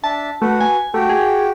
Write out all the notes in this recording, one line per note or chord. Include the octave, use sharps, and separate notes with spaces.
D4 E5 A5
A3 F#4 B4 F#5
G#5
A3 F#4 G4 G5
G#4